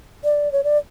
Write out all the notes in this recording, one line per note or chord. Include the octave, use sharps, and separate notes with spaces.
D5
C#5
D5